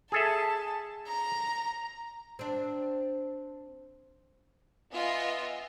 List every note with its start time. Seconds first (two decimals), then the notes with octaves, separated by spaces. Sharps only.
0.12 G#4 A4 E5 A5
1.08 A#5
2.39 C4 D4
4.94 B3 F4 D#5 E5 G#5